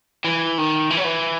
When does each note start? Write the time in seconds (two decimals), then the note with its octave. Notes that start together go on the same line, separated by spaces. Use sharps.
0.24 E3
0.58 D#3
0.90 E3
0.97 F#3
1.04 E3